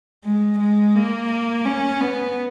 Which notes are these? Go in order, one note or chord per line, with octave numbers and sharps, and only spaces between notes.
G#3
G#3
A#3
C#4
B3